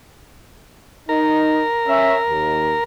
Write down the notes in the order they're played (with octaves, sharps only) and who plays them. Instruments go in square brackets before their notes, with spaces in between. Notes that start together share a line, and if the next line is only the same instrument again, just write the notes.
[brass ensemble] D#4 [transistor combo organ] A#4
[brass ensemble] C#4 E5
D#2